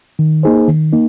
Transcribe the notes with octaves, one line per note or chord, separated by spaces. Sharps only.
D#3
A#3 D#4 G#4 C5
D#3
A#3 D#4